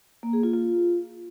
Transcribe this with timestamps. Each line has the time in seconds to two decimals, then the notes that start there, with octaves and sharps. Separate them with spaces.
0.23 A#3
0.33 G#4
0.43 F4
0.54 F4